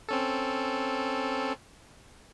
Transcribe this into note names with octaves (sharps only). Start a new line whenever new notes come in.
C4 C#4 A4